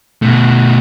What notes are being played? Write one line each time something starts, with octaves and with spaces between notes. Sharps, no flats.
B2 A3